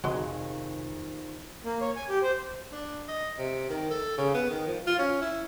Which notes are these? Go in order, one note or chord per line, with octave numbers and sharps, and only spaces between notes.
F1 A#1 D#2 F#4 G#4 C5 D#5
A#3
C#5
G#5
G4
C5
D4
D#5
C3
D#3
A4
C#3
B3
D#3
F3
F4
C#4
E4